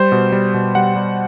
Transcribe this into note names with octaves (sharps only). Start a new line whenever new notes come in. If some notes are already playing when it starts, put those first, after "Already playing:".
Already playing: G3 C5
B2
G3
B2
G3 F#5
G3